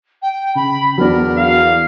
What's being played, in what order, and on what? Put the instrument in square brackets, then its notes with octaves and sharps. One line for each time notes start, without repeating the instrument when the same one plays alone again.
[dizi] G5
[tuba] C#3 [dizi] B5
[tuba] E2 [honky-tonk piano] F#3 D4 [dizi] A#4
[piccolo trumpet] F5